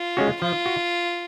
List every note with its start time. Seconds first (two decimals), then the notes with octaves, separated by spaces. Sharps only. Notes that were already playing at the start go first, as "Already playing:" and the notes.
Already playing: F4
0.17 G#3 C#4 F#4
0.42 F3 F4
0.66 F#4